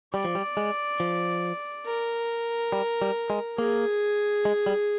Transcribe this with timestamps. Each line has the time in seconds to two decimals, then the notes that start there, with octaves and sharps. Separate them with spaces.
0.14 G3 D5
0.24 F3
0.35 G3
0.57 G#3
1.00 F3
1.86 A#4
2.72 G3
3.02 G3
3.30 G#3
3.58 A#3 G#4
4.45 G#3
4.66 G3